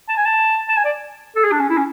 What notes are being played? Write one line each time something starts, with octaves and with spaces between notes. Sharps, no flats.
A5
G#5
A5
A5
G#5
D5
A4
G#4
D4
C#4
E4
C#4